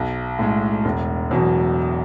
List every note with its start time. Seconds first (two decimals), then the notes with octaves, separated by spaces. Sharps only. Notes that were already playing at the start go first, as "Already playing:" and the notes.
Already playing: B1
0.39 A2 G#3
0.85 E1
1.31 E2 B2 F#3